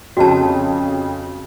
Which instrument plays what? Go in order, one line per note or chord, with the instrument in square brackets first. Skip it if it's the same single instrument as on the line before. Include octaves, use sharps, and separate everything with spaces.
[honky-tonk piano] F2 C#3 [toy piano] F#4 A5